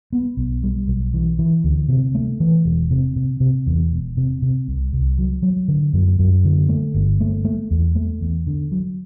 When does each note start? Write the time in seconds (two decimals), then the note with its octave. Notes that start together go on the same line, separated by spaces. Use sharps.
0.13 B3
0.37 B1
0.63 G3
0.88 B1
1.14 E3
1.39 E3
1.64 D2
1.89 C3
2.15 A3
2.40 E3
2.65 E1
2.91 C3
3.16 C3
3.40 C3
3.66 E2
3.91 E1
4.17 C3
4.42 C3
4.68 C2
4.93 C2
5.18 F#3
5.42 F#3
5.68 D3
5.93 F#2
6.19 F#2
6.45 D3
6.69 A3
6.94 G1
7.21 A3
7.45 A3
7.71 E2
7.95 A3
8.21 E2
8.47 D3
8.72 F#3